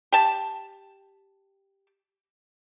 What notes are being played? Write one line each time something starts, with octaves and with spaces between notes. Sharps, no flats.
G4 A5